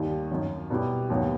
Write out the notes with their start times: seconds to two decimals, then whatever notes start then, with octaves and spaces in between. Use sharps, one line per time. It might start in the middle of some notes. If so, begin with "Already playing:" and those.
Already playing: D#2 D#3 G3
0.31 F#2 D#3 F#3
0.70 B2 G3 B3 E4 G4
1.10 D#2 D#3 F#3 B3 F#4